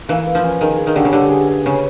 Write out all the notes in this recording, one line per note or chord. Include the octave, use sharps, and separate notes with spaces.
E3 A#3
B4
F3
C#4
D#3 G#4
G#4
D#3
D3 G3
C#3
D3 G3
G#4
G#4
C#3 B4